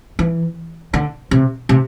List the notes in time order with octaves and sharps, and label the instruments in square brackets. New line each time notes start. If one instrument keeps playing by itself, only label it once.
[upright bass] E3
D3
C3
C3